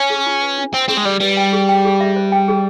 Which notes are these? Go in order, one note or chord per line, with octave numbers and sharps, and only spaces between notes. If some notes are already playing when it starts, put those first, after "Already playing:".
Already playing: C#4
G#4
F4
B4
D4
C4 G5
C4 G#4
G#3
G3 D5
G3 B4
G5
G#4
G5
G#4
E5
C5
G5
G#4